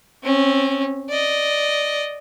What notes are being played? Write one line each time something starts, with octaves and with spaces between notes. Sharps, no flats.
C4 C#4
D5 D#5